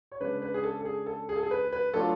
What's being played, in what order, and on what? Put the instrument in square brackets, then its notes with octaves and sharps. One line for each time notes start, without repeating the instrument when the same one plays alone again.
[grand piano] C#5
C#3 G#3 D4 B4
B4
G#4
A4
A4
G#4
A4
G#4
A4
G#4
B4
B4
F#3 A3 D4 F4 A4